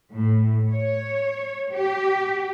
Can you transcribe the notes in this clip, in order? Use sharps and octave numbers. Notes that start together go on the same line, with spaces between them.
A2
C#5
G4